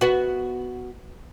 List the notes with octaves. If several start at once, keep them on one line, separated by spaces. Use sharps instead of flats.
B3 F#4